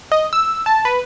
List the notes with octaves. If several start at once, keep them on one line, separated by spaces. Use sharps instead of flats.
D#5
E6
A5
B4